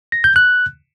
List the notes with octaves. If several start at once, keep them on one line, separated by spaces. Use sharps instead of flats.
A#6
G6
F#6